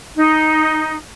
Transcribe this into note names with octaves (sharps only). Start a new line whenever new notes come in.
D#4